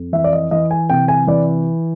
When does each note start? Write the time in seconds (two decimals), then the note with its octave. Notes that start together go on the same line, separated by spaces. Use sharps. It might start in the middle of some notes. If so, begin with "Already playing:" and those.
Already playing: F2
0.13 E3 E5
0.24 D5
0.33 D#5
0.51 E3 D#5
0.71 G#5
0.90 C3 G5
1.08 G#5
1.27 E3 D5